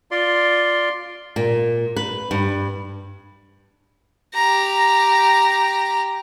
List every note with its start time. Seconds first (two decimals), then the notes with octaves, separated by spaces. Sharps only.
0.11 F4 D5 C6
1.36 A#2
1.96 B4
2.31 G2
4.34 G4 A#5